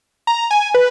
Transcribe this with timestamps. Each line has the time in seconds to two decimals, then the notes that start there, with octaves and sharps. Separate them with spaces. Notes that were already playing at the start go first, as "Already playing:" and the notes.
0.27 A#5
0.51 G#5
0.74 B4